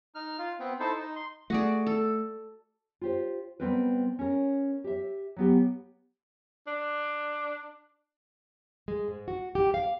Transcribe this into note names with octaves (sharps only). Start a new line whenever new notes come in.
D#4 F6
F4
B3 C4
D#4 E4 A4 C5
D#4
C6
A3 F#4 G#4 D5
A4
F4 G4 C5
G3 B3 C4 A#4 B4
C#4 A#4
G4 E5
F#3 B3 G4
D4
G#3
G#2
F#4
G4
F5